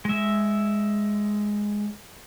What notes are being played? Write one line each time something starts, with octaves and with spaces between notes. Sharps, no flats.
G#3 E5